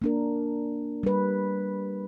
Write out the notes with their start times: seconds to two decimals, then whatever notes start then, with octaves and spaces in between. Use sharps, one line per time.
0.02 A#3 D4 A#4
1.03 G3 B4